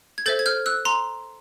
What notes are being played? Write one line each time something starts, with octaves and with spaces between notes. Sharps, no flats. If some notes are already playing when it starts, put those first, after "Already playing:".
G#6
A4 C5 E5 G6 A6
G#6
F6 G6
E6 F#6
A#5 C6